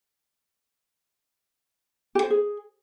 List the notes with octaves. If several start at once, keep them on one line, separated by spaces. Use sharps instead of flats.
G4
C5
G#4